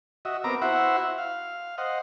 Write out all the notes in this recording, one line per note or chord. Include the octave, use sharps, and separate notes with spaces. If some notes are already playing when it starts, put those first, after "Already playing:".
F#4 D#5 E5
B3 C4 A#4 A#5 D6
E4 F#4 C5 E5 F#5
F5
C5 D#5 F#5